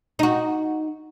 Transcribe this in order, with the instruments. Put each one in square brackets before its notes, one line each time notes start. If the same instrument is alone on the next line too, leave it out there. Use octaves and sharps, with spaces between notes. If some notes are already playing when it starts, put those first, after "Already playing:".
[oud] D#4 F#4